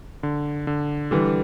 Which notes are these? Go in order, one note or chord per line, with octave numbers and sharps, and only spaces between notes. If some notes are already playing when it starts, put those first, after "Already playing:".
D3
D3
D3 E3 G3